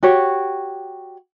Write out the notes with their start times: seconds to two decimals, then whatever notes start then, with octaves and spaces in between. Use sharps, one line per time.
0.03 F#4 G4 C#5